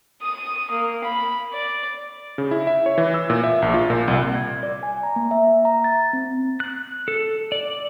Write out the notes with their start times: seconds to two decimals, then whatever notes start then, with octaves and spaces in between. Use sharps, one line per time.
0.23 D#6
0.71 A#3
1.04 B5
1.53 D5
2.38 C#3
2.51 E4
2.67 E5
2.86 C#5
2.98 E3
3.14 E6
3.30 A#2
3.44 E5
3.62 A#1
3.74 F4
3.90 A#2
4.08 C2
4.35 G#6
4.63 D5
4.83 G#5
5.03 A#5
5.16 A#3
5.31 E5
5.65 A#5
5.84 A6
6.13 C4
6.60 F#6
7.08 A4
7.52 D5